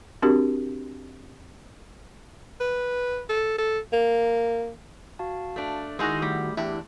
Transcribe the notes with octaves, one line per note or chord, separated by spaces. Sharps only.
C4 D4 F#4 G4 A#4
B4
A4
A4
A#3
F#4 F5 A5
A3 D4
D#3 G#3 D#4 E4 F#4 G#4 E6 A#6
G3 A3 G#4
E2 D4 E4 G4